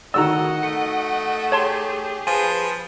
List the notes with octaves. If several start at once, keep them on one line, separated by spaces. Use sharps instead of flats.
A2 D#3 F#4 D5 D#5 F#5 A#5 E6
A3 C#7
G4 G#4 C#5 A5 C6
F3 G#4 B4 G#5